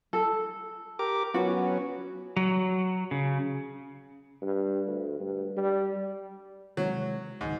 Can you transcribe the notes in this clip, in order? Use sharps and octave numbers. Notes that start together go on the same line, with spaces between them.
A4
G4 A#4 D6
F#3 B3 C#4 F#4
F#3
C#3
G2
D2
G2
G3
C3 D#3 F#3 G#3
C#2 G#2 D#3